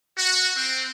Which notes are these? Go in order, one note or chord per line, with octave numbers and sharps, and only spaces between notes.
F#4
C4